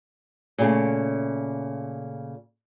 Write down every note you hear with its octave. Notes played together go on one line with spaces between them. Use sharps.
A#2 C#3 A3